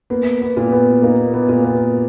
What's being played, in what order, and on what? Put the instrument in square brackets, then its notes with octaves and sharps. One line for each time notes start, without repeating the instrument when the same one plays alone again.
[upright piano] A#3 [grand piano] B3
[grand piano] B3
[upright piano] A#2
[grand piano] B3
[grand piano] A#3 [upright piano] D#4
[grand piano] B3
[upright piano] A#2
[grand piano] B3